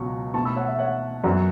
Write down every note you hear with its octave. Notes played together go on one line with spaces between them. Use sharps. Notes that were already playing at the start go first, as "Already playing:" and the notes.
Already playing: C#2 B2 F#3 C#6
B2 A3 A5 C#6
B5 E6
C#5 F#5
E5
C#5 F#5
F#2 F#3 B3